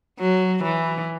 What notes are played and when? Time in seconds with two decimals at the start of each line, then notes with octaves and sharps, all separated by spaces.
0.20 F#3
0.63 E3